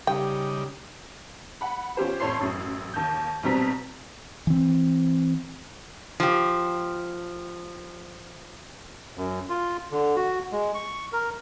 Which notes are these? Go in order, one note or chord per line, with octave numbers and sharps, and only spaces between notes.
C#3 G3 D#4 G4 G5
F#5 B5
C#4 F4 G4 C5
F2 A2 C#5 A5 C6 C7
A1 F#2
D#2 G6
B1 B2 G3 C4 A#5 B6
E3 C4
F3 G4
F#2
F4
D3
F#4
G#3
C#6
A#4